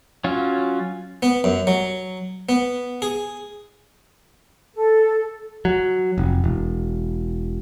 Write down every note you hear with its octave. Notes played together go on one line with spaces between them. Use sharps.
F#3 C#4 F4
B3
F#2
F#3
B3
G#4
A4
F#3
F1
E1